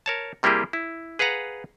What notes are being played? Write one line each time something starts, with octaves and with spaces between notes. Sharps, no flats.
A#4 C#5 A5
C3 G3 A#3 E4 G4 G#4
E4
G#4 B4 F5 F#5 A#5